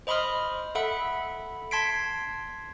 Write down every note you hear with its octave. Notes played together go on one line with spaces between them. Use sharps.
C5 D#5 B5 C6 D#6 F6
A4 E5 F#5 B5
A5 C6 G#6 B6 C7 D7